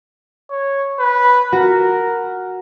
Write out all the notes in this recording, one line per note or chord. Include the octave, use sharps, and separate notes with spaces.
C#5
B4
F#4 A#4